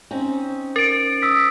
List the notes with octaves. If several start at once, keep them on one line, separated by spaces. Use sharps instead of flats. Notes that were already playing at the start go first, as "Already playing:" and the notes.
C4 C#4 D#4
A#4 A6 D7
D#6 E6 B6